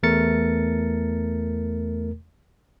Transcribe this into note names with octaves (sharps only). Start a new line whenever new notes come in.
E2 A3 A#4 A6 C#7